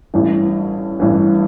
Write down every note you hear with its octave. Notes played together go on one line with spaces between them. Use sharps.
A1 G2 E3
A1 G2 E3